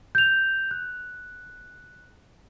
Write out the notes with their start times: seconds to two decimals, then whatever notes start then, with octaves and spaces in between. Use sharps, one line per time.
0.15 G6 F7
0.71 F#6